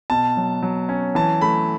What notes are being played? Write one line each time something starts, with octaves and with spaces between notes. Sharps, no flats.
B2 A5
F#3
F#3
C#4
E3 A5
A3 B5